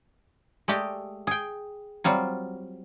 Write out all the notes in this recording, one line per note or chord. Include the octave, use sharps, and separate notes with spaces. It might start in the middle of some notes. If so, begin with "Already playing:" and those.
G#3 A3 G4 D5 D#5
G#4 G5
F#3 G3 C4 F4